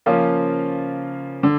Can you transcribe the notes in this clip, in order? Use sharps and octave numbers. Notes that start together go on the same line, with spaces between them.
C#3 F3 A#3 C#4 F4
D3